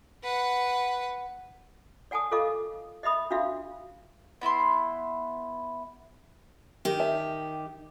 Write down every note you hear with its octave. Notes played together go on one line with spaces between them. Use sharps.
B4 F#5
D5 F#5 G#5 A5 D#6
F4 A4 A#4 D#5 F5 D6
D#5 E5 B5 D#6
D4 F4 F#4 E5 F5
B3 E4 E5 C6
D#3 G4
E5 A5